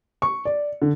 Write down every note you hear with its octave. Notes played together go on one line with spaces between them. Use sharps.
C#6
D5
D3